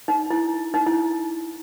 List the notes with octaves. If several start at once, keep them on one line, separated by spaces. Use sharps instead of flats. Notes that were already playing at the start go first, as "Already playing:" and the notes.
D#4
E4
D#4
E4